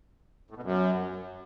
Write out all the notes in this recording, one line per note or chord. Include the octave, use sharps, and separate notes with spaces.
A2
B2
F#2